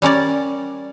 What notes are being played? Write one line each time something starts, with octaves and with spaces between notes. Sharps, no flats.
G3 C#4 A#4 D5